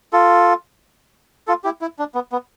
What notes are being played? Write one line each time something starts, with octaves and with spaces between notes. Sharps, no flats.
F4 A4
F4 A4
E4 G4
E4
D4
B3
B3